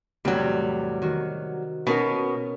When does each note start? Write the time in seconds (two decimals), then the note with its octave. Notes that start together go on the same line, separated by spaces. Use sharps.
0.25 E2 A2 C3 F#3 G3
1.02 D#3 F#4
1.87 B2 B3 C#4 D#4 A#4